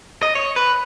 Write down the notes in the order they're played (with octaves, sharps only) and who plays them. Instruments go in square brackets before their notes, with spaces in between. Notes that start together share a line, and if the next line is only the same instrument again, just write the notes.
[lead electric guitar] D#5
C#5
B4